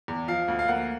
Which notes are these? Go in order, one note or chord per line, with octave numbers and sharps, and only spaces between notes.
E2
F3 F5
D2
F5
A#3 F#5